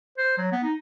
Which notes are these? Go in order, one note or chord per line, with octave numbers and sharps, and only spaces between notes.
C5
F#3
B3
D#4